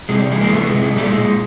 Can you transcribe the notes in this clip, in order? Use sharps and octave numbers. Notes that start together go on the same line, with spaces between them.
C3 G#3
G3
E3 G#3
G#3 A#3
C3 A3 B3
G#3
C3
G#3
A#2 G3 A3
G#3
A#2
G#3